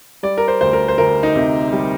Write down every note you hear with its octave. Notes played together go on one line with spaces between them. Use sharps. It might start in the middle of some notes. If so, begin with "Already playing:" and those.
G3 D5
A#4
C5
D2 C5
A#4
C5
D2 A#4
D#4
C3
G3